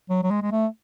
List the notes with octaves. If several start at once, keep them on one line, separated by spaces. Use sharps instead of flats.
F#3
F#3
G#3
G#3
A3